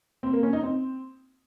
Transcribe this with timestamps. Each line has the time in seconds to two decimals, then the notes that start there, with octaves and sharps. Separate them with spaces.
0.23 C4
0.33 A#3
0.43 C#4
0.53 D#4
0.63 C4